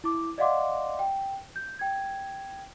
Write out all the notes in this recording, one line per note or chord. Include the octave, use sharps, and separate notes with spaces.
E4 D6
D5 D#5 F5 F#5 C6 D6
G5
G6
G5 G#6